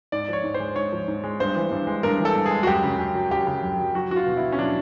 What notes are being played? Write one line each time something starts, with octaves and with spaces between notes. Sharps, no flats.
G#2 D5
F3 C#5
G#2
C5
G#3
G#2 C#5
F3
G#2
G#3
G2 C5
E3
G2
G#3
G2 A#4
E3
A4
G2
G#4
G#3
F#4
F#2 G4
C#3
F#2
F#3
F#2 G4
C#3
F#2
F#3
F#3 F#4
F#3 F#4
F4
B2
E4
B2
C#4
F#3 D4